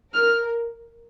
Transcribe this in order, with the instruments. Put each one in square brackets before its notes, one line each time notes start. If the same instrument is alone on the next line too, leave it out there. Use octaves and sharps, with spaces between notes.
[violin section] A#4 [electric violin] F6